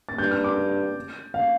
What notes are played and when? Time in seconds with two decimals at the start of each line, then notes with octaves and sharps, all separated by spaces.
0.09 A6
0.18 G2 G6
0.31 F6
0.44 D6
1.34 F5